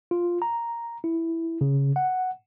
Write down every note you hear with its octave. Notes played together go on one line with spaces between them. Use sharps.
F4
A#5
E4
C#3
F#5